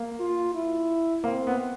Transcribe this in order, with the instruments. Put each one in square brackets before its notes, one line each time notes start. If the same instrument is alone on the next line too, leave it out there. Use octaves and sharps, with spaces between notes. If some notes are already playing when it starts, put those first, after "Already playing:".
Already playing: [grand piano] A#3
[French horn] F4
E4
[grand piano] A#3 [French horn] C4
[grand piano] B3